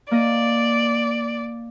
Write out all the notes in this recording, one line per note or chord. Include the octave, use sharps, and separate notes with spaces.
A#3 D5 D#5